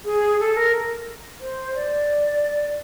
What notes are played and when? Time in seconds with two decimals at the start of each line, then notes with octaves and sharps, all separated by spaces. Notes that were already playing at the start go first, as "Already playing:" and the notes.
0.05 G#4
0.40 A4
0.57 A#4
1.41 C5
1.75 D5